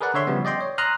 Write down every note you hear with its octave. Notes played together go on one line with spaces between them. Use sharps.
G#4 A#4 B4 D5 F#5
D3 C#5 E5 C6
C#3 F3 G3 B3
D5 D#5 G5 C6
C#5
A#5 C6 D#6 F6 F#6